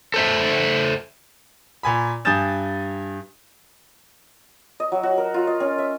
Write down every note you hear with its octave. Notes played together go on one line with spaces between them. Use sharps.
A4 C5 E5
A#2 G#5 B5
G2 G#5 D#6 G6 A6 E7
D#5
F#3
F#4
A#4
F4
D#5
C#4
E5